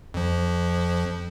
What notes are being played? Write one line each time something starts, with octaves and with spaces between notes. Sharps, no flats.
F2 F3